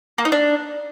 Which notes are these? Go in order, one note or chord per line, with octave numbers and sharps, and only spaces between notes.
A#3
D#4
D4